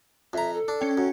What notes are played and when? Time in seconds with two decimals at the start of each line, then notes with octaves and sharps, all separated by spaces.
0.33 F2 E5 A#5
0.54 A4
0.68 D4
0.81 C#4 G5
0.97 F#2